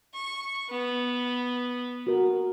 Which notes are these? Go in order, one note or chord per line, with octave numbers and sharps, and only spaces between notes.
C#6
B3
F#4 A#4